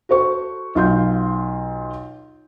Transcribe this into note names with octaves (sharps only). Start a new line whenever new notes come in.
F#4 A4 C5 C#6
B1 F4 C6 G6